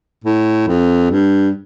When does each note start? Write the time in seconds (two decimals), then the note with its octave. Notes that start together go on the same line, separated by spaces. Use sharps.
0.24 A2
0.67 F2
1.11 G2